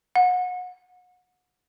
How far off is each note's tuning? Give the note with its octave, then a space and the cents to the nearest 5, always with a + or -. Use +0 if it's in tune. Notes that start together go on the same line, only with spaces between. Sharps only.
F#5 -30